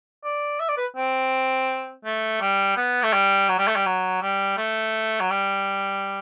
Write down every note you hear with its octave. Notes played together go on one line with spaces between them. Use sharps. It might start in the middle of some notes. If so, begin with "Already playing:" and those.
D5
E5
D5
B4
C4
A3
G3
B3
A3
G3
F#3
G3
A3
G3
F#3
G3
A3
F#3
G3